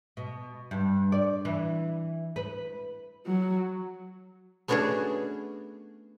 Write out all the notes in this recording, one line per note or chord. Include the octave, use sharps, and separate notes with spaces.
B2
G2
D5
E3
B4
F#3
A3 B3 C#4 D4 F#4 G#4